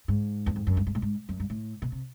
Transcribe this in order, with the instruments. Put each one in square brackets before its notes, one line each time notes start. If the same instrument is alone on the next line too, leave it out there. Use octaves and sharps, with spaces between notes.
[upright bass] G#2
E2
F2
F#2
G2
G#2
A2
G#2
F#2
G2
A2
B2
C3